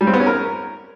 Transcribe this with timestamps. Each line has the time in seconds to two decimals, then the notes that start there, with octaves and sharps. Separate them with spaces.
0.01 G3
0.07 C4
0.14 B3
0.20 C#4
0.26 A#4